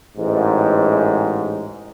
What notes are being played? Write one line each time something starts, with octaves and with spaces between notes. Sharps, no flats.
A1 G#2